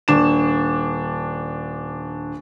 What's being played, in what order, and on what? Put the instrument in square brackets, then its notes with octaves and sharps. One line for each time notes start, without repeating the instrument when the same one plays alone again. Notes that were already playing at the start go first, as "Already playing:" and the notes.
[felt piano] D#1 D4 E7